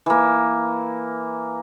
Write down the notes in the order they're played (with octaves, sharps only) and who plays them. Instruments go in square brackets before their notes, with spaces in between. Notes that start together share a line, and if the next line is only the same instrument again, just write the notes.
[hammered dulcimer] E3 A#3